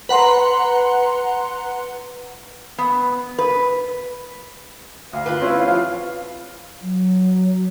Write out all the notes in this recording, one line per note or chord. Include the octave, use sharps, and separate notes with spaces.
B4 F#5 A#5 C6
B3
B4
D2 F5
F4 B4
C4 C#4 E4
F3 F5
F#3